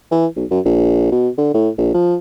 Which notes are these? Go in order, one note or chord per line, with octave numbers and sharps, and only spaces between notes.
E3
B1
F#2
A#1
B2
D3
A2
A#1
F3